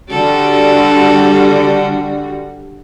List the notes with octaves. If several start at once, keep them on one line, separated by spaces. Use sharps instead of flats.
D3 G3 F#4 A4 D5